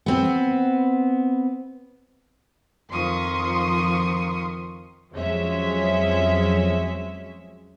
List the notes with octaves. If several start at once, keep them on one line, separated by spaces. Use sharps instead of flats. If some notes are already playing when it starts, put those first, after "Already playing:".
B3 C4
F2 D#3 F3 C6 C#6 D#6
F2 F#3 G#3 C#4 E5